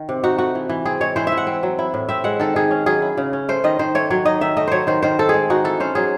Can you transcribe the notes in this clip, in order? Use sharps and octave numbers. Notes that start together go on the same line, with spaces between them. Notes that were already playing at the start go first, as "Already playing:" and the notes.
Already playing: D#3
C3
D#4 F#4
A3 F#4
E3
E3
C4 G#4
G#3 C#5
E3 C5
E5
E3
F#5
C4
F#3
E4
A2
C4 E5
G#3 F#5
D#3 A4
D#3 G#4
C#4
F#3 G#4
E4
C#3
C#4
A3 C5
D#3 D#5
D#3 C5
A3 C#5
F#3 C#5
D#4 D#5
D#3 E5
A3 D#5
F#3 C5 C#5
D#3 C5
D#3 C5
C4 A4
G#3 G#4
D#4 F#4
E3 A4
C#4 C5
F#3 G#4